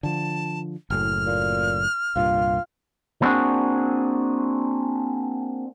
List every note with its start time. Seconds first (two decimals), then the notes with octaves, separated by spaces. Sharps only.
0.03 D3 F3 A5
0.90 F#1 A2 F6
1.26 A#2
2.16 C2 G2 A#2 F4
3.22 A#3 C4 D4 F#4 G#4